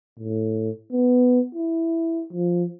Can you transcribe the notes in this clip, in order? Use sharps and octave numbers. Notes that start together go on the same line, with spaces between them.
A2
B3
E4
F3